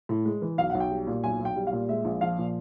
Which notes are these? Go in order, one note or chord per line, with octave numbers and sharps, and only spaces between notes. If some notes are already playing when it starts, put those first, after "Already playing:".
A2
G#3
E3
B1 F5
F#5
B1
G5
G3
A#2
B1 G#5
B1
G5
G3
F5
A#2
G#3 E5
A#1
F3 F5
A#2